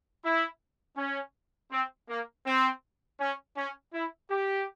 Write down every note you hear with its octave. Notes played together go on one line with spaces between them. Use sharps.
E4
C#4
C4
A#3
C4
C#4
C#4
E4
G4